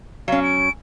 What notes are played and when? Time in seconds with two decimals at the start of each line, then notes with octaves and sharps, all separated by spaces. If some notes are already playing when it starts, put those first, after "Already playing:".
0.28 F#3 C#4 F5
0.43 D7